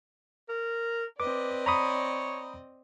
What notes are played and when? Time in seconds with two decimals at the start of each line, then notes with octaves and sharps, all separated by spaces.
0.49 A#4
1.20 C4 B4 D5 D#5 D6
1.66 C#5 A#5 B5 D#6